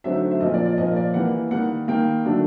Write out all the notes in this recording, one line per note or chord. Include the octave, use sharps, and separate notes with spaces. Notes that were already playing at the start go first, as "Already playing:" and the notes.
D3 F#3 A3 C4 D#4 E5
E5
A#2 F3 A#3 D#5
D5
D5
A#2 F3 A#3 D#5
D5
E3 G3 A#3 F#5
D#3 G3 A#3 F#5
D#3 G3 A#3 G5
D3 F#3 A3 D4